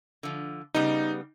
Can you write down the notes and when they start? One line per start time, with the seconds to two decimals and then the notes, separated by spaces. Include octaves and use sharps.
0.23 D3 F3
0.74 C#3 G3 B3 D#4